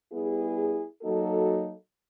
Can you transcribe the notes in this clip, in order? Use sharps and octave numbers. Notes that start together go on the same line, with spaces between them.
G3 B3 E4 G#4
F#3 A#3 D#4 F#4 A4